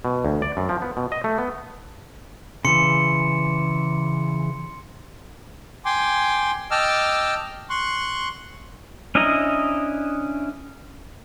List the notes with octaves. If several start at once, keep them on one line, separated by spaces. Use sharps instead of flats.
B2
D2
D5
F#2
F3
B3
B2
D#5
A3
B3
C#3 E3 C6 C#7
G5 G#5 C6 D6
D#5 G5 A5 D6 E6 F6
C6 C#6 F#6
C#4 D4 E4 D#5 A#5